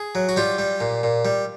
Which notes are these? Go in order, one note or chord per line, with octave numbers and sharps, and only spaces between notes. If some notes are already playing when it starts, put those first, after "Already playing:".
Already playing: G#4
F#3
F#4
G3 F4 G4
G3
A#2
A#2
G3